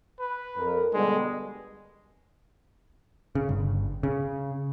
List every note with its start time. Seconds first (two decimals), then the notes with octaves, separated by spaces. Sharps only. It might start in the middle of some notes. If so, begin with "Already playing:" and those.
0.19 B4
0.57 F2 A#4
0.94 B2 D3 G3 G#3
3.35 C#3
3.49 G1
4.03 C#3